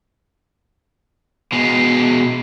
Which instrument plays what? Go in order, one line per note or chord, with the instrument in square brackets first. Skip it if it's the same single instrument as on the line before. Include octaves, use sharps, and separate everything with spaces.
[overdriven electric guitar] B2 G#3